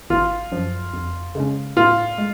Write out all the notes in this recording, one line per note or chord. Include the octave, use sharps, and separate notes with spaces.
G#1 F4
F#2 F3
F2
C#3 G#3 C#4
A2 F4
G#3